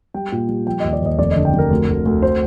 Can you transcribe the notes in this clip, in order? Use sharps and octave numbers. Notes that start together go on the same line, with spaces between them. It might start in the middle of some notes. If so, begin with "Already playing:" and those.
G3 G5
A#2
G3
F3 G5
D#2 D#5
D5
D#2 D#5
F1 D5
D#5
D3
G5
F1 A#4
D2
D2
D2
C5